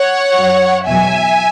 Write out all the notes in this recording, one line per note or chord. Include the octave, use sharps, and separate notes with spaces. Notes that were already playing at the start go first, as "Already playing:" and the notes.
Already playing: C#5 F#5
F#2 F#3
E2 B2 F#3 E5 G#5